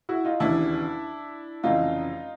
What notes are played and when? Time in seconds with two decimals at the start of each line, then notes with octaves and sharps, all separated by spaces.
0.09 E4 F#4
0.24 D#4 F4
0.40 E1 D#2 C#3 E3 D4 E4
1.63 F1 F2 C#3 E3 D#4 F4